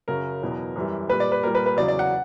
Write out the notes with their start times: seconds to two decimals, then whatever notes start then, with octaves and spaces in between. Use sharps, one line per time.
0.08 F#2 C#3 F#3 A#4
0.42 E2 B2 F#3
0.76 F#2 E3 G3
1.09 A#2 G3 B4
1.20 D5
1.32 B4
1.43 A#2 G3 A#4
1.55 B4
1.66 B4
1.77 E2 C#3 F#3 D5
1.88 D5
1.99 F#5